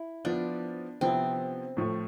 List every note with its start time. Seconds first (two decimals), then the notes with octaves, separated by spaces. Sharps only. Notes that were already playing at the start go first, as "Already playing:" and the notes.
Already playing: E4
0.25 F3 B3 D4 F4
1.01 C3 F3 B3 C4 E4
1.77 A2 F3 A3